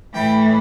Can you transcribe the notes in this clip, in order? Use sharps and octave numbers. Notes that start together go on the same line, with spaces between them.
A2 E3 A3 G5